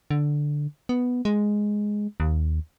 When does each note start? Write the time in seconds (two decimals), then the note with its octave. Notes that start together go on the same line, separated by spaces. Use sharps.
0.11 D3
0.89 B3
1.25 G#3
2.20 D#2